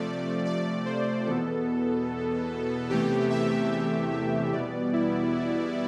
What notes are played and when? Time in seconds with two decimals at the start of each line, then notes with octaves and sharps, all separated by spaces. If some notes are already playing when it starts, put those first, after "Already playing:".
Already playing: C3 F3 A3 D5
0.45 D5
0.86 C5
1.26 E2 B2 B3 A4
2.90 E2 C3 E3 A3 G4
3.30 E5
3.71 E5
4.12 E5
4.52 E2 B2 G3 B3 D5
4.93 E4
5.35 E4